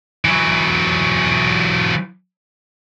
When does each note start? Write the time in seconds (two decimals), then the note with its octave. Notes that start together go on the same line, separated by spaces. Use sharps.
0.25 E3 F#3